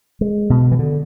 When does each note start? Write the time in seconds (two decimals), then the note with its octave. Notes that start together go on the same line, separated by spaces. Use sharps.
0.21 G#3
0.50 B2
0.72 E3
0.79 D3